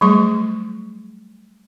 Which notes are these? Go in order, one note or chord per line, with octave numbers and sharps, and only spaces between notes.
F#3 G3 A3 G#4 C#6